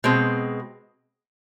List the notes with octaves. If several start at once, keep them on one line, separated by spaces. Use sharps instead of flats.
B2 G#3 C4